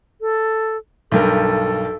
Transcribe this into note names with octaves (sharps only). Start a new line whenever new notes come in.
A4
B1 G2 A4 A#4